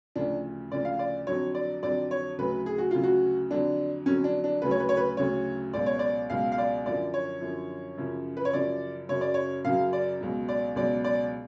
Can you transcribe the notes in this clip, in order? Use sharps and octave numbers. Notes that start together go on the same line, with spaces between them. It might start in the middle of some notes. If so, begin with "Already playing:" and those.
D2 C#3 F3 D4
D2 C#3 F3 D5
F5
D5
F2 D3 F#3 C#5
D5
F2 D3 F#3 D5
C#5
D2 C#3 F#3 B4
G#4
F#4
D2 C#3 F#3 F4
F#4
F2 D3 F#3 D4
F2 D3 F#3 C#4
D4
D4
D2 C#3 F#3 B4
C#5
B4
C#5
B4
D2 C#3 F#3 C#5
C#2 B2 F#3 D5
C#5
D5
C#2 B2 F#3 F5
F5
D5
F#2 D3 F3 D5
C#5
F#2 D3 F3
F#2 C#3 F3
B4
C#5
F#2 C#3 F3 D5
F#2 C#3 F#3 C#5
D5
C#5
F#2 C#3 F#3 F5
D5
C#2 B2 F#3
D5
C#2 B2 F#3 D5
D5